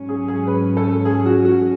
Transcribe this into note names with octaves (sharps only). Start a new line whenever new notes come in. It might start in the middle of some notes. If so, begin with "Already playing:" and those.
Already playing: G#2 F#3 C#4
G#4
G#4
B4
A4
G#4
F#4
F#4